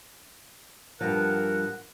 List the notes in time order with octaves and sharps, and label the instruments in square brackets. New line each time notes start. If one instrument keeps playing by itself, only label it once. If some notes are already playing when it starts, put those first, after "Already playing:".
[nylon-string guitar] G2 F3 [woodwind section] A#4 F#5